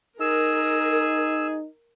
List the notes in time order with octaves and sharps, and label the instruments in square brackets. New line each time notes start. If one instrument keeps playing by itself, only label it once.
[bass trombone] D#4 [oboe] G#4 [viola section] A#4 [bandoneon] E6